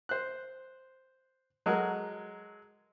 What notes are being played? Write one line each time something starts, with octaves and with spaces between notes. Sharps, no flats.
C5 F#6
F#3 G#3 F#4 A4 A#4